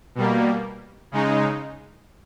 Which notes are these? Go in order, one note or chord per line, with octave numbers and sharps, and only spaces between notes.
B2 G3 A#3
C#3 G#3 D#4